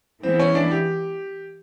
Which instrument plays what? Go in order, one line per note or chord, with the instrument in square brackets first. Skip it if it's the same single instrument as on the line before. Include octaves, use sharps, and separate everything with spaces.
[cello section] E3 G#3 B3 E4 [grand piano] C4
[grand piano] C#4
D4
G4